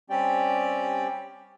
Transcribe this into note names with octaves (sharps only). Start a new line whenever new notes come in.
G3 C4 C#4 G4 D5 G5